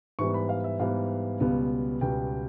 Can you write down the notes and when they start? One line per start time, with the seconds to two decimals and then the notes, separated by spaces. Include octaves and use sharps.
0.19 G#2 E3 G3 B3 C#6
0.34 B5
0.49 F5
0.64 E5
0.79 G#2 E3 G3 B3 F5
1.40 C#2 B2 G3 B3
2.01 C#2 B2 G3 B3 G5